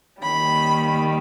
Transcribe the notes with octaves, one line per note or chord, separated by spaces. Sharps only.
D#2 D#3 G3 B5